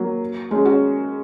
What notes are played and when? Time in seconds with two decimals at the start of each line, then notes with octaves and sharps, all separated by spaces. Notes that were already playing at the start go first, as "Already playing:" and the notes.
Already playing: F#3 A#3
0.51 G#3 C#4
0.65 C#4 F#4